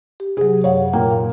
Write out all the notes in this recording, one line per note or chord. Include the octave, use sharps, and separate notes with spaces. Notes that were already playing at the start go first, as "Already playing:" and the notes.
G4
C3 F#3 G#4
F#2 C#5 F5 F#5
A#2 A#3 G5
F5